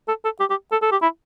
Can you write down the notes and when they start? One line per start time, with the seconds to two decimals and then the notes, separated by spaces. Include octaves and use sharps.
0.08 A4
0.25 A4
0.40 G4
0.50 G4
0.72 A4
0.82 A4
0.92 G4
1.02 E4